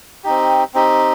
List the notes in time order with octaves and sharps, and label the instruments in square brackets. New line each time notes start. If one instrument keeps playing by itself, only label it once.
[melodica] C4 D#4 G4
C4 D#4 G4